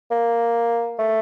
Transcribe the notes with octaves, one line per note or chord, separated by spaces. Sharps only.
A#3
A3